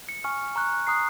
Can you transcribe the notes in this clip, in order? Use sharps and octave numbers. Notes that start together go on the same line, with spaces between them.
C#7
G#5 C#6 F6
A#5 C#6 F#6
A#5 D#6 F#6 C7